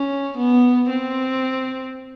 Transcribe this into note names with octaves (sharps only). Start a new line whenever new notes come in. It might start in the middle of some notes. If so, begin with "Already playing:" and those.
Already playing: C#4
B3
C4